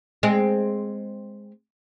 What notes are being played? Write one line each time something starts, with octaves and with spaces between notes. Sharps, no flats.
G#3 C4